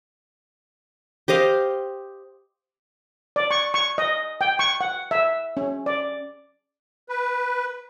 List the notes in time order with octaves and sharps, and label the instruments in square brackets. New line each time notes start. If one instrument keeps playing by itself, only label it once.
[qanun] G4 C5 D#5 F5
[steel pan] D5
C#6
C#6
D#5
G5
C#6
F#5
E5
C#4
D5
[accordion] B4